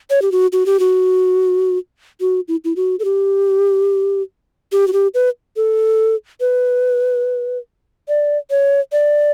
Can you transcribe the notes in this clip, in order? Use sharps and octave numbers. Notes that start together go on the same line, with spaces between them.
C#5
G4
F#4
F#4
G4
F#4
F#4
E4
E4
F#4
A4
G4
G4
F#4
G4
B4
A4
B4
D5
C#5
D5